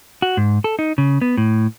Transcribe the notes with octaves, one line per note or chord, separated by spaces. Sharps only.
F#4
G#2
A4
D#4
C#3
B3
A2